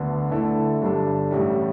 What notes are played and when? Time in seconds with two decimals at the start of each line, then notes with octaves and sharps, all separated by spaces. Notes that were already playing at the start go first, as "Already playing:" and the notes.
Already playing: D2 D3 B3
0.31 D3 A3 E4 A4
0.81 G1 G2 G3 D4 A4
1.31 A1 A2 G3